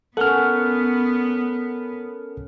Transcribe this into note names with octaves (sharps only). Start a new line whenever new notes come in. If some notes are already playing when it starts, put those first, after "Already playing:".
B3 C#4 A4 A#4 F#5 F6